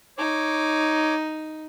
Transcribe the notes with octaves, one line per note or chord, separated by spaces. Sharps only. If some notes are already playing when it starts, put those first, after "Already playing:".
D#4 C#5 D6